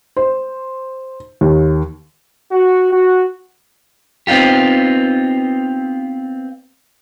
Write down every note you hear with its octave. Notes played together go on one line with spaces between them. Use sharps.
C5
D#2
F#4
F#4
B3 C4 D#4 F4 G4